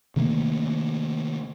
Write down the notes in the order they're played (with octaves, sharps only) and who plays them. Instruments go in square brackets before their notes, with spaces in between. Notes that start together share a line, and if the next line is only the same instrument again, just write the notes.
[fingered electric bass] C3 D#3 A3 A#3